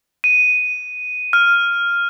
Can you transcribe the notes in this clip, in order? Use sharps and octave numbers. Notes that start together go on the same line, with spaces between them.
D#7
F6